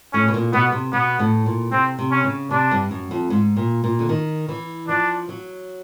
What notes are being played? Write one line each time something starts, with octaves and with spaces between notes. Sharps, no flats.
A2 C#4
B2
A#2
B2 B3
C3
B2 B3
A2
A#2
C3 C4
C3
C#4
C#3
C3 D4
G2
F#2
F2
G#2
A#2
A#2
D3
D#3
E3
F3 D4
F#3